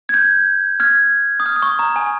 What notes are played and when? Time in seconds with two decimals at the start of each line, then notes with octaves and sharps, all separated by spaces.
0.09 G#6
0.14 G6
0.80 F6 G#6
1.40 D#6
1.46 F6
1.56 D#6
1.62 C#6
1.79 A#5
1.96 G#5